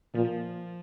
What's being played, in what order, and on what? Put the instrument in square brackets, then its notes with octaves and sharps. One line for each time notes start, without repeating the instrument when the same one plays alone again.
[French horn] A#2 [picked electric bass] F3